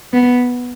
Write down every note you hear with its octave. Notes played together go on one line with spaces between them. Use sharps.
B3